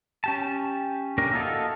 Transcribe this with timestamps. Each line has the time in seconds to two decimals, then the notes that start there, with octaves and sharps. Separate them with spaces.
0.24 C#4 G4 A5
1.18 A#3 C#4 D4 G4 A#4
1.33 E4 F#4 A4 D#5 F5